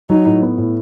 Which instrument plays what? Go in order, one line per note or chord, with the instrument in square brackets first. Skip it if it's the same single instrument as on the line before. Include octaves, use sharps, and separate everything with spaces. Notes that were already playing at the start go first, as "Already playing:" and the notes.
[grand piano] F#3 [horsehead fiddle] D#4
[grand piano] A2
B3
A2